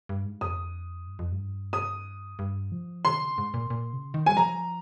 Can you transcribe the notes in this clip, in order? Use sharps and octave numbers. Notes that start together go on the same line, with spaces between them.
G2
G#2
F2 D#6
G2
F2
G2
D#6
G2
F3
D#3 C6
C#3
G#2
A#2
A#2
C#3
D#3
G3 G#5
F3 A#5